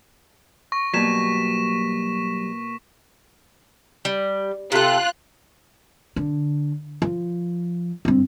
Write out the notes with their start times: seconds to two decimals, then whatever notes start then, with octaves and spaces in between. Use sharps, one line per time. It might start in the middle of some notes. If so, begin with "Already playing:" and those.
0.72 C#6 A#6
0.94 B2 F#3 G3 A#3 B6 E7
4.05 G3
4.72 C3 F4 A4 F#6
6.16 D3
7.02 F3
8.05 G2 C4